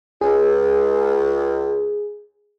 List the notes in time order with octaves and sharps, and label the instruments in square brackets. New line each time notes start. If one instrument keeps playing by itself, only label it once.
[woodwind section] C#2 [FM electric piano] G#4